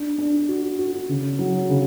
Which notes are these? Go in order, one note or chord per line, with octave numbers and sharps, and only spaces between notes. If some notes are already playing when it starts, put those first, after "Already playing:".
Already playing: D4
D4
F#4
F#4
C#3
F#3
C#3